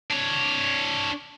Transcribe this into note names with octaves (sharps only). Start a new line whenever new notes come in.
D4 C#5